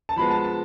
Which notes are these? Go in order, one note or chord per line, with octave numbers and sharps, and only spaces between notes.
A5
F3 G#3 B3 B5
A5
A5